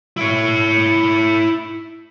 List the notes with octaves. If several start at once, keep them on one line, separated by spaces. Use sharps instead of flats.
E4 C#5